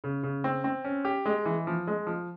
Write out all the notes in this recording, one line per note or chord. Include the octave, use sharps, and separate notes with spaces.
C#3
C#3
C4
C4
C#4
G4
G#3
E3
F3
G#3
F3